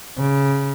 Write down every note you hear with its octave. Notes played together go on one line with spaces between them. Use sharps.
C#3